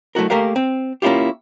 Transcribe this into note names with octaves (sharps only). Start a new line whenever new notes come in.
F#3 A3 E4 F#4 A#4
A3 A#3 G4 A#4 F5
C4
A#3 C#4 E4 F4 G4